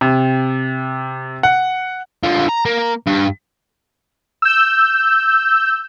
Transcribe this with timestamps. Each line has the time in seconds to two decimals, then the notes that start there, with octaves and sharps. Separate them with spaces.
0.01 C3
1.43 F#5
2.23 D3 F4
2.49 A#5
2.65 A#3
3.06 G2
4.42 E6 G6